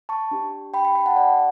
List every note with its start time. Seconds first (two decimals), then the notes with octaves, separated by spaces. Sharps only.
0.09 A5 C#6
0.31 D4 G4
0.74 G5 B5
0.85 G5 B5
0.95 G5 B5
1.06 F#5 A5
1.16 D5 F#5